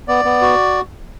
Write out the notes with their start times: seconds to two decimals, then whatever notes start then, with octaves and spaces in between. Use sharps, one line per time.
0.08 B3 D5
0.25 B3
0.42 F#4